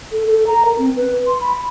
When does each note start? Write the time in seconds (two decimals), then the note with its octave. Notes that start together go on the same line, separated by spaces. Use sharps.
0.12 A4
0.27 A4
0.47 A#5
0.65 A#4
0.78 C4
0.96 B4
1.27 C6
1.41 B5